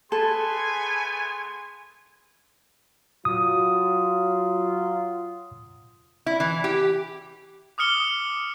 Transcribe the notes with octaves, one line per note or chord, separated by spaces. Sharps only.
A3 B3 G#4 A4 G#5 B5 C6
F#3 F4 D#6
E4
E3
G4
D6 D#6 F6 C#7 G7